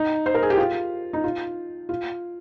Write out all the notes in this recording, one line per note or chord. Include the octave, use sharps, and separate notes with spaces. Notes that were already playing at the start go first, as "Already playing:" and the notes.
Already playing: D#4
C5
A#4
G#4
G4
F4
D#4
F4
F4